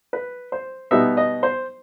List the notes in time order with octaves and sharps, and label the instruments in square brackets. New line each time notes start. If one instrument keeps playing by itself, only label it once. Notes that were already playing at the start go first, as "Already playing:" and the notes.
[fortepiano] B4
C5
B2 G3 B3 D#4 E5
D#5
C5